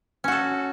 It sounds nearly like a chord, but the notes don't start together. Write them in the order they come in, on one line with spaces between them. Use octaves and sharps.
C#4 F#4 A4